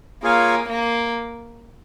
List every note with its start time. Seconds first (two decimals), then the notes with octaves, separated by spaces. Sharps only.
0.23 A#3 F4 G#4 C#5 F5 G#5
0.69 A#3